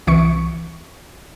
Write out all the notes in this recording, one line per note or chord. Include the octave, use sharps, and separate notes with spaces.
C2 E3 C#6 C#7